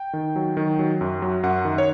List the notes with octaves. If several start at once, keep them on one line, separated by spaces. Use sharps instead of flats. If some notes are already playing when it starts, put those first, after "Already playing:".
Already playing: G5
D#3
F#3
D#3
F#3
F#2
F#3
F#2 F#5
D#3
C#5